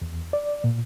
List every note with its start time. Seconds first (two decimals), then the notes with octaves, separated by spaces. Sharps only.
0.02 E2
0.33 D5
0.64 A#2